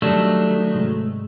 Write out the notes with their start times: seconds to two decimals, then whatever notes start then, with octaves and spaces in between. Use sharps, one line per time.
0.02 D#3 F#3 G3 A3 D4 G4 A4
0.74 G#2 C3 G#3